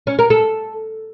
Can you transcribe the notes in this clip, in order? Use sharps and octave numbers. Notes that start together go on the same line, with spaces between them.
C#4
A#4
A4